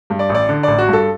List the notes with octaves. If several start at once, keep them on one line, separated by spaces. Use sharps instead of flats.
G2
D5
A1
D5
D3
A1 D5
F#4
G2 A4